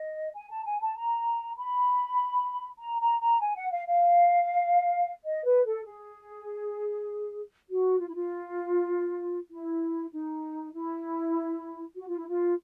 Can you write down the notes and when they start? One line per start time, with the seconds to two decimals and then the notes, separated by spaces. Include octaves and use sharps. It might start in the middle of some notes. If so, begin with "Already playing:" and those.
Already playing: D#5
0.34 G#5
0.50 A5
0.65 G#5
0.81 A5
0.96 A#5
1.57 B5
2.79 A#5
3.00 A#5
3.19 A#5
3.41 G#5
3.55 F#5
3.71 F5
3.87 F5
5.24 D#5
5.44 B4
5.64 A4
5.84 G#4
7.68 F#4
7.98 F4
8.07 E4
8.14 F4
9.51 E4
10.13 D#4
10.73 E4
11.96 F#4
12.06 F4
12.17 E4
12.28 F4